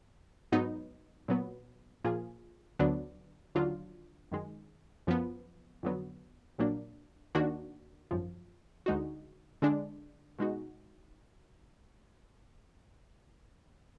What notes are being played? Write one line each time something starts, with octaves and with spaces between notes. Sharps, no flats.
G#2 F#3 B3 D#4
A#2 F#3 B3
A#2 F3 A#3 F4 G#4
D2 D3 F#3 B3 D4
D#2 D3 F#3 D4 F4
F#2 D#3 G#3
F#2 F3 B3
F2 D3 F#3 B3
A#1 A#2 F#3 A#3 D4
D#2 D#3 A#3 D4 F#4
G#1 F#2 F3
D2 D3 G#3 D#4 F#4
D3 G#3 D4
B2 G#3 D#4 F#4